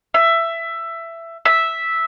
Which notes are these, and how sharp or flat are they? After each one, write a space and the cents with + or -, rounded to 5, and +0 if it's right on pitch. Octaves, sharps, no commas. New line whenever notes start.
E5 +15
E5 -5